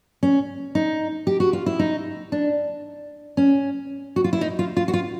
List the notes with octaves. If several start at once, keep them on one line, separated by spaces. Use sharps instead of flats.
C#4
D#4
G4
F#4
F4
E4
D#4
D4
C#4
F#4
F4
E4
D#4
F4
F4
F#4
F4